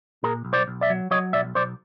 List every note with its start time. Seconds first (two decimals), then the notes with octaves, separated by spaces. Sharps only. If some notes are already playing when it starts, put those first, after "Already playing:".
0.23 A#2 G#4 A#4
0.45 B1
0.53 C5 D5
0.68 B1
0.81 D5 E5
0.90 F#3
1.11 F#3 C#5 D#5
1.33 B1 D5 E5
1.55 B1 C5 D5